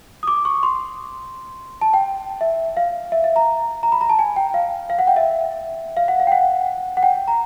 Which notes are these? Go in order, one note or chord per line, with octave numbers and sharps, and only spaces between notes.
D#6
D6
C#6
C6
A5
G5
E5
F5
E5
E5
A#5
A#5
B5
A#5
A5
G#5
G5
F5
F5
F#5
G5
E5
F5
F#5
F5
G5
F#5
F#5
G5
A#5